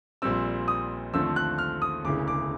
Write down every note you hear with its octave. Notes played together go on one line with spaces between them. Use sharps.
A#1 A#2 G3 C4 E6
D#6
D#2 D3 F3 A3 C4 E6
F#6
F6
D#6
E1 D2 C#3 E3 D6
D6